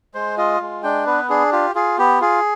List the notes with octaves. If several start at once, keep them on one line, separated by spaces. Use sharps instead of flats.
G#3 C5
F4 D#5
G#3
D4 G5
B3 B4
D4 G#4
F4 G4
F4 G#4
B3 G4
F4 G#4